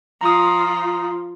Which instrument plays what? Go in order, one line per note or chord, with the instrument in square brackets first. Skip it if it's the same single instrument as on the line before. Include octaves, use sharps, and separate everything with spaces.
[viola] F3 F4 [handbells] A#5 D#6